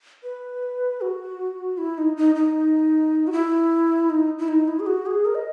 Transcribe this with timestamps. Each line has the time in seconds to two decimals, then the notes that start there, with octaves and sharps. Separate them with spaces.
0.23 B4
1.01 F#4
1.78 E4
1.98 D#4
2.17 D#4
2.35 D#4
3.27 F#4
3.33 E4
4.10 D#4
4.39 E4
4.48 D#4
4.68 E4
4.80 G#4
4.86 F#4
5.06 G#4
5.25 A#4
5.35 D#5